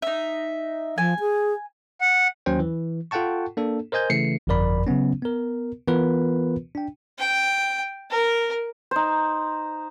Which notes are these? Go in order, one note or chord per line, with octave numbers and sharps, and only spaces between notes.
D#4 E5
F3 G#5
G#4
F#5
D#2 F#3 C#4 C5 G5
E3
F4 A4 F#5 G5 A5 C#6
A#3 D4 A4
A#4 C5 D#5 G#5 G6
C#3 E3 A3 C7 C#7
G1 F2 F3 A#4 D5 B5
C#3 F#3 B3 C#4
B3 A#4
E3 B3 F4 A#4 B4
D4 G5
G5
A#4
D#4 C5